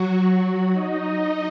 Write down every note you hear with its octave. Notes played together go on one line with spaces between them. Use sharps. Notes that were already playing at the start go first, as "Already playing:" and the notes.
Already playing: F#3 F#4
D#4 D#5